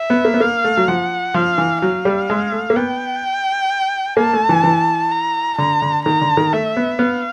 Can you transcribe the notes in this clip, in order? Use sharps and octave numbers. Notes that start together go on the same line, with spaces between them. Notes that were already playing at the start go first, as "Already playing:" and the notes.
Already playing: E5
B3
A#3
B3
A#3 F5
A3
F#3
F3 F#5
F3 F5
E3
F#3 F5
G3
G#3
A3
A#3
B3 G5
A#3 A5
A3
E3
E3
A#5
D3 A#5
D3
D#3 A#5
D3
D#3
A3 E5
B3
B3 F5